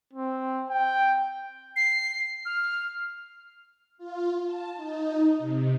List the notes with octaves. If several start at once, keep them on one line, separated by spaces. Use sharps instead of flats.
C4
G5
C7
F6
F4
A5
D#4
C3